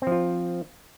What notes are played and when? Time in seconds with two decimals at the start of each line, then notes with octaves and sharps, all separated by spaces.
0.02 C4
0.07 F3
0.12 F4